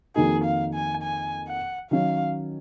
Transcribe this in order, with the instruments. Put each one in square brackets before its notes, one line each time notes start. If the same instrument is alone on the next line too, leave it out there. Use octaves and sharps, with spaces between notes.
[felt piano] F2 D#3 A#3 D#4 F#4 [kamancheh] G#4
[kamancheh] F5
G#5
G#5
F#5
[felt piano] D#3 F#3 C#4 [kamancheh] F5